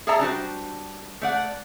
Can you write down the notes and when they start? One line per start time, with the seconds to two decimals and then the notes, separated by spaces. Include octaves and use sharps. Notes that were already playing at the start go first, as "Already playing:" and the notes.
0.07 G#4 A4 D5 E5 A5 A#5
0.20 G3 D4 F#4 C5
1.22 A3 D5 F#5